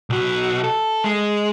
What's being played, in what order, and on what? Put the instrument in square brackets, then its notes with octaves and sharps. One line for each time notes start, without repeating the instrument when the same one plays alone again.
[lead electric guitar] B1 F#4
A4
G#3